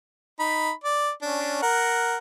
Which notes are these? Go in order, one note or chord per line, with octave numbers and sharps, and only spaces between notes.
D#4 B5
D5
C#4 D4
A#4 F#5